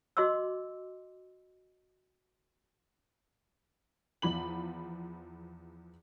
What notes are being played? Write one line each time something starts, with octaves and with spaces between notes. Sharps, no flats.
F#4 D#5 C6 D6 E6
E2 F3 B5 F#7